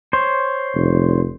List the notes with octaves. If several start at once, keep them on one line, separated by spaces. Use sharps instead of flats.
C5 C#5
F1